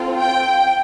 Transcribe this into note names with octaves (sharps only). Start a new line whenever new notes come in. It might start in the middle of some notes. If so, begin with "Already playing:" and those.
Already playing: C4 F4 A4
G5